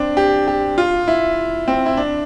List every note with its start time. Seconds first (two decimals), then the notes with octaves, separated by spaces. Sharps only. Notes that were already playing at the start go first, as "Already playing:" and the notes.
Already playing: C4 D4
0.17 G4
0.47 G4
0.78 F4
1.08 E4
1.68 C4
1.86 E4
1.97 D4